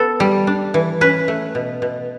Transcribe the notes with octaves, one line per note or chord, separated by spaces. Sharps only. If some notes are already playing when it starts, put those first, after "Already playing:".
Already playing: B3 A4
G3
D4
E3
C#4 B4
A3
B2
B2